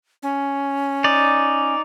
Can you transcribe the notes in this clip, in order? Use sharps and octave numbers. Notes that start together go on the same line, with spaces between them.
C#4
D#4 D5